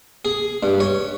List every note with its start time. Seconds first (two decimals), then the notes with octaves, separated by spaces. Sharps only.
0.25 G#4
0.63 G2
0.80 C#5